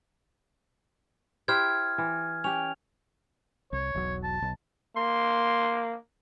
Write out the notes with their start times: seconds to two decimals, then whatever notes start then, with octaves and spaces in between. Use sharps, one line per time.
1.48 E4 G4 C5 F6 G#6
1.98 E3
2.44 C#4 G4 F7
3.73 C2 C#5
3.95 E1 B1 F#3
4.24 A5
4.42 B1
4.97 A#3 C6